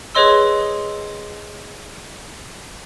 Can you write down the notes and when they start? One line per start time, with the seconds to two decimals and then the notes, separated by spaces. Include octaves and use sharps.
0.15 G#4 B4 C#5 D#5 C6 E6